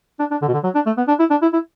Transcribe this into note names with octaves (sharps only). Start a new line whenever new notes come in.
D4
D4
D3
B2
D3
F#3
D4
A3
B3
D4
E4
D4
E4
E4